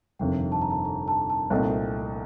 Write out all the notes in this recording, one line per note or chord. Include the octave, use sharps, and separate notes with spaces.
G1 F2 C3 D#3 G5
A5
A#5
A5
A#5
A5
A5
C2 A#2 A3 C4 D#4 G5